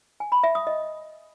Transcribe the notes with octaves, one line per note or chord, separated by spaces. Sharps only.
G#5
B5
E5
D#6
D#5